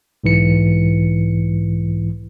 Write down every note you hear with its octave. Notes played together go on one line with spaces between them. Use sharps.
B1 G#2 E3 C#7